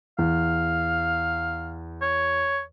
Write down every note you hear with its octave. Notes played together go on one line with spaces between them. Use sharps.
E2 F5
C#5